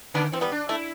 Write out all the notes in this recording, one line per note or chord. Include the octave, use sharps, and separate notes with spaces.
D3 B3 D4
E3 C4
G3 B3
D4
A3 E4